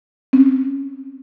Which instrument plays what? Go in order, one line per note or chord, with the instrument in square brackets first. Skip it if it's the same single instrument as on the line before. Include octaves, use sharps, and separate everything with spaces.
[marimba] C4 C#4